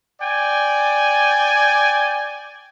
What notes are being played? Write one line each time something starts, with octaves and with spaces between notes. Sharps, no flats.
D5 G5 G#5